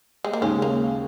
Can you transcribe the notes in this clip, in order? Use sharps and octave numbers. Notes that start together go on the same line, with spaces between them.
G#3
A#3
D#2 C#3 G#3 C#4
A#3